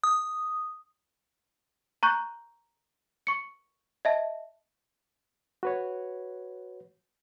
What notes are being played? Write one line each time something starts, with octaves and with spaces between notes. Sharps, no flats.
D#6
A#5 C#6 F#6 G6
C#6 C#7
D#5 E5 A5
F#4 B4 C#5